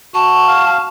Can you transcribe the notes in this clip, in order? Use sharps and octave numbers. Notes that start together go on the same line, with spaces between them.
F#4 A5
F5